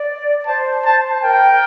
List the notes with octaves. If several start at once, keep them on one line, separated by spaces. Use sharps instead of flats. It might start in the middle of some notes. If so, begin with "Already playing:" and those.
Already playing: D5
D5
C5 A5
A5
A#4 G5